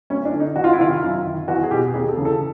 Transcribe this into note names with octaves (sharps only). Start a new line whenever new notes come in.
D2 C#4
D4
D3
D#4
E2 F#4
F4
E4
C3 D#3 F4
F#2
D#3
E2 F#4
G#4
B2 G4
D#2 G#4
A4
C#3 E3
A4